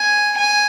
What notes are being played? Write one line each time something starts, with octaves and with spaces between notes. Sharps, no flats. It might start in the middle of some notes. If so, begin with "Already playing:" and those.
Already playing: G#5
G#5